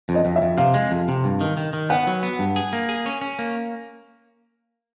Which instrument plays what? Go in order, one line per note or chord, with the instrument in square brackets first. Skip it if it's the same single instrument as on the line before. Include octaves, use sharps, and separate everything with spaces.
[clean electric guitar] F2
[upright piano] D#5
[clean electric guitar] F2
[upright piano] E5
[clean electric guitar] F2
[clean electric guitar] C3 [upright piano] F5
[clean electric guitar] G#3
F2
C3
G2
D#3
D#3
D#3
[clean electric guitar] B3 [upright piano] F#5
[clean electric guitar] F#3
B3
G2
G#4
A#3
G#4
C#4
C#4
A#3